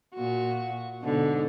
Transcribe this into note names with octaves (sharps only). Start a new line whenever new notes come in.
A#2 F#4
G#2 B2 D3